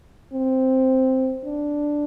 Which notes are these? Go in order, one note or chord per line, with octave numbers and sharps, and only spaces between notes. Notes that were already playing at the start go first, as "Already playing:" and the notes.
C4
D4